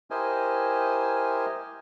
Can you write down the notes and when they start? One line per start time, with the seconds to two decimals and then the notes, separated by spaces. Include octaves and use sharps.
0.10 E4 G4 A#4 C5 D#5 G#5